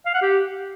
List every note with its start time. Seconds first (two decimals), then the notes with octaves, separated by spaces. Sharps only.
0.06 F5
0.14 F#5
0.22 G4